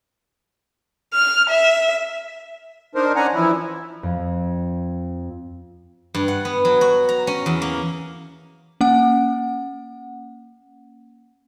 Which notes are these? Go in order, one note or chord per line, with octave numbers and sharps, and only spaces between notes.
F6
E5
D4 D#4 A#4 C5
C#4 D4 F#5 G#5 A#5
E3 F3 E4
F2
G2
F#5
B3
F#3
F#4
A#5
C#4
E2
A#3
A#3 C#4 F#5